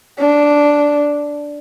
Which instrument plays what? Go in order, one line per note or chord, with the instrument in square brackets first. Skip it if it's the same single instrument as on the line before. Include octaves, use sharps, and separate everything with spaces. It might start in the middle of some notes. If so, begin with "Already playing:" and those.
[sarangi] D4